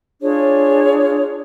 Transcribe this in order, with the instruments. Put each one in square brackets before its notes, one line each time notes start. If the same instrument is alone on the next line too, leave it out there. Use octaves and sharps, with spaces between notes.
[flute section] D4 F4 G#4 C#5